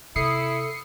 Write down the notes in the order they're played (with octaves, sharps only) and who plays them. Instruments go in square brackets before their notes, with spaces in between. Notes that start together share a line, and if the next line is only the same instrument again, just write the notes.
[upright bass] C3 [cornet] E4 [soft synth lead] A4 [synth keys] D#6 C7 C#7